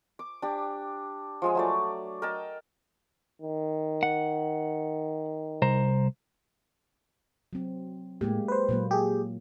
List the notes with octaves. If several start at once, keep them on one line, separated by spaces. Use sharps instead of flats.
D6
D4 G4
F3 G#3 G#5
F#3 A3 D5
A#4 D#5 G5 A5
D#3
F#5
C2 C5 A#5
F#3 C4
A2 G#3 A#3 G4
B4 C5
A#2 F#3 A#3
G4 G#4